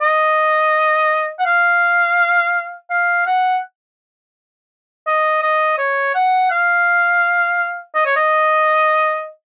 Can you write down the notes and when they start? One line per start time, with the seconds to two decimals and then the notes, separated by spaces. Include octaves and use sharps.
0.01 D#5
1.39 F#5
1.46 F5
2.90 F5
3.26 F#5
5.07 D#5
5.42 D#5
5.78 C#5
6.15 F#5
6.51 F5
7.95 D#5
8.05 C#5
8.16 D#5